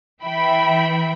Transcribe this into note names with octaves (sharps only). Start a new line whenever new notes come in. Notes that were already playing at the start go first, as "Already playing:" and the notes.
E3 E5 G5 B5